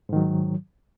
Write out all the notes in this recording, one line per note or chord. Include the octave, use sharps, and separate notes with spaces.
G#2 D#3 F#3